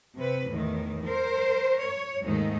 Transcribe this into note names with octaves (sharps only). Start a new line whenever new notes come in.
C3 B4
E2 A2 D#3
A#4 C5
C#5
D#2 G#2 D#3 A3 D#4